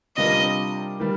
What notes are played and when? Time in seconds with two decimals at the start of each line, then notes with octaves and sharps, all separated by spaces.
0.17 C3 G3 D4 F4 A#4 D#5
1.00 D#3 G3